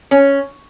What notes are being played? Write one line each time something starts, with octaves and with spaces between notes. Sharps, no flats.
C#4